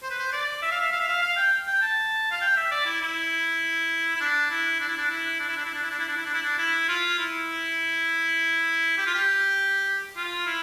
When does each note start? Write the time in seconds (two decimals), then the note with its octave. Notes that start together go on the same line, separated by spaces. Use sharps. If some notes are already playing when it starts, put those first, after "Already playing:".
0.03 C5
0.11 B4
0.19 C5
0.33 D5
0.62 E5
0.72 F5
0.81 E5
0.92 F5
1.00 E5
1.09 F5
1.22 F5
1.37 G5
1.67 G5
1.82 A5
2.32 F5
2.42 G5
2.57 E5
2.71 D5
2.86 E4
3.01 E4
4.16 E4
4.21 D4
4.51 E4
4.80 D4
4.89 E4
4.98 D4
5.10 E4
5.40 D4
5.49 E4
5.57 D4
5.65 E4
5.74 D4
5.83 E4
5.91 D4
5.99 E4
6.08 D4
6.17 E4
6.26 D4
6.34 E4
6.43 D4
6.58 E4
6.89 F4
7.19 E4
8.98 G4
9.06 F4
9.14 G4
10.17 F4
10.47 E4